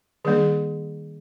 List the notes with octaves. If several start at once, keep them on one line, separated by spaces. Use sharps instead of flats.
D#3 G3 A#3 D4 G#4